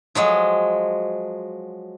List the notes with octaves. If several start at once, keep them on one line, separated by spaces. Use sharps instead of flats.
F3 F#3 G#3